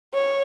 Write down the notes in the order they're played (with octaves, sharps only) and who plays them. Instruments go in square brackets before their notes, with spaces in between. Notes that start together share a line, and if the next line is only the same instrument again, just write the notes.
[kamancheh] C#5